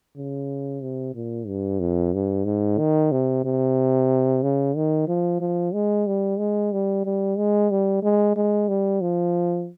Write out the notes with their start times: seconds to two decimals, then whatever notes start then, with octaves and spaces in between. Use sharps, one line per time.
0.16 C#3
0.82 C3
1.14 A#2
1.47 G2
1.80 F2
2.14 G2
2.45 G#2
2.78 D#3
3.12 C3
3.45 C3
4.43 C#3
4.76 D#3
5.08 F3
5.40 F3
5.74 G#3
6.07 G3
6.39 G#3
6.72 G3
7.05 G3
7.38 G#3
7.71 G3
8.03 G#3
8.36 G#3
8.68 G3
9.01 F3